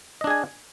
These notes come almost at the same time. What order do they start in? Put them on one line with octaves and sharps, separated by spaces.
D#5 D4 G#4 G#5